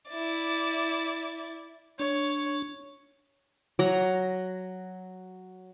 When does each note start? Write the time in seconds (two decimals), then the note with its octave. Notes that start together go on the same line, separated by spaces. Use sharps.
0.10 E4 D5
1.99 D4 C#5
3.79 F#3 A#5